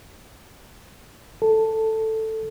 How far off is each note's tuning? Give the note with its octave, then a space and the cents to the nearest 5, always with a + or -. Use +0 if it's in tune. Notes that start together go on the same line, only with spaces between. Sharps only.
A4 +5